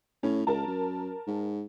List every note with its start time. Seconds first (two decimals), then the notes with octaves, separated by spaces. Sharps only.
0.23 A2 C#4
0.47 C#2 A#4 A5
0.67 F#2
1.27 G#2